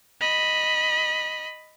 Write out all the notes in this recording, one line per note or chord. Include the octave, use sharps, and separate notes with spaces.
D#5 B5